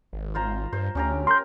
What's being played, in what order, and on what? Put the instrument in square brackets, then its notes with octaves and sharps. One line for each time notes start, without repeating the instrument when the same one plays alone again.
[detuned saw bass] G#1
[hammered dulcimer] F4 C5 A#5
[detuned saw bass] G2 [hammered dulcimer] C5
[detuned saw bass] D2 [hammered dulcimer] C#4 G4 A#5
[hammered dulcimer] A#4 [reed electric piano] C6 G6